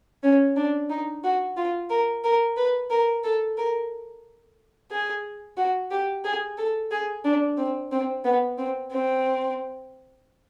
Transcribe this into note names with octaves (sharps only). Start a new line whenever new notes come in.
C#4
D4
D#4
F#4
F4
A#4
A#4
B4
A#4
A4
A#4
G#4
F#4
G4
G#4
A4
G#4
D4
C4
C4
B3
C4
C4